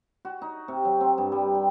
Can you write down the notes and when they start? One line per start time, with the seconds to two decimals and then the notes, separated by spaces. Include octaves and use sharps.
0.25 F#4
0.42 D#4
0.68 C3
0.85 F#3
1.01 C4
1.18 G2
1.32 G3
1.55 G5